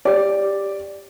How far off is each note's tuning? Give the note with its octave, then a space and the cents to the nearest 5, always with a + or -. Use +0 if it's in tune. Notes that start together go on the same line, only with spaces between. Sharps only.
G4 +10 D5 +0